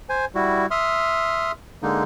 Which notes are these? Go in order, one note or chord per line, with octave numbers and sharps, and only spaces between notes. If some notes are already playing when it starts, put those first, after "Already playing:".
C5 G#5
G3 E4 F#4
E5 C6 D#6 F6
D3 G#3 A#3 D#4